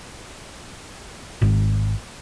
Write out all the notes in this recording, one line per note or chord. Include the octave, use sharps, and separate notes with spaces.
G#1